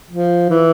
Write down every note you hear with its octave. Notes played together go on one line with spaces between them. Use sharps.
F3
E3